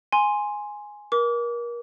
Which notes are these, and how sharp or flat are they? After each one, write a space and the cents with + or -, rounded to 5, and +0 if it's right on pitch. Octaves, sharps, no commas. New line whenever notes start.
G#5 +0 C6 +0
A#4 +30 D6 -30